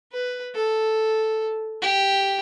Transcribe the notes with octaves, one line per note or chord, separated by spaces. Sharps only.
B4
A4
G4